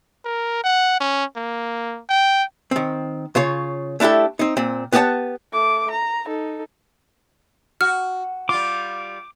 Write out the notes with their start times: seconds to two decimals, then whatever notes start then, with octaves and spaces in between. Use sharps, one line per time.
0.25 A#4
0.64 F#5
1.00 C#4
1.36 A#3
2.09 G5
2.71 D#3 C4
3.35 C#3 F4 C#5
4.00 A3 D4 E4 G4 A4
4.39 C4 D#4
4.57 A#2 C4
4.92 B3 G4 G#4 D5 F#5 A5
5.53 A3 D6
5.91 A#5
6.26 D#4 A4
7.81 F#4 F6
8.49 G3 F4 D6